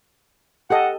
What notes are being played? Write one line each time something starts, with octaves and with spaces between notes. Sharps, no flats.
G4 A4 D#5 F#5